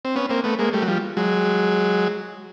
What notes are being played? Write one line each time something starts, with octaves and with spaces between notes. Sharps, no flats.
C4
B3 C#4
A#3 C4
A3 B3
G#3 A#3
G3 A3
F#3
F3 G3
F#3 G#3